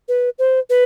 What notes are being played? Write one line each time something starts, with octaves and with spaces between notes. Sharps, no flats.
B4
C5
B4